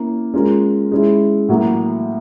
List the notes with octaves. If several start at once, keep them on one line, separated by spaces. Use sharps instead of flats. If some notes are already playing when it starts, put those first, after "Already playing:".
Already playing: A#3 C#4 E4
G#3 C#4 F4 A#4
G#3 C#4 E4
A2 F#3 A#3